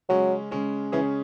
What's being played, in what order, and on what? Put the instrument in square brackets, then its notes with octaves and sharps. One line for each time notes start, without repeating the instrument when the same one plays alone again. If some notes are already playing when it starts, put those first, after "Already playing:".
[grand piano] C#3 G#3 C#4 [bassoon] F#3
[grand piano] C#3 G#3 C#4
[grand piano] C#3 G#3 C#4 G#4 [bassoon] E3